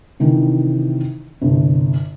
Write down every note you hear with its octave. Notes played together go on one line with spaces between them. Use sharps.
C3 D#3 E3 C4 D4
G1 C2